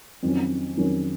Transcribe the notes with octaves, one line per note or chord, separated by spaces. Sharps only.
F2 D#3 F#3 C#4
F2 D#3 F#3 C#4